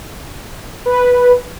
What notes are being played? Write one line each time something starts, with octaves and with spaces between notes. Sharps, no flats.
B4